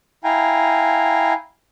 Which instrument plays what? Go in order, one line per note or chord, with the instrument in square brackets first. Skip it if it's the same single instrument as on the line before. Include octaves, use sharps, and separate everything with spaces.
[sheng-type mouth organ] E4 F5 G5 G#5 A#5